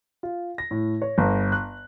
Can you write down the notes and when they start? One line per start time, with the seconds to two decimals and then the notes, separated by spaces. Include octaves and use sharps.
0.23 F4
0.58 A#6
0.71 A2
1.02 C#5
1.18 G1
1.52 F#6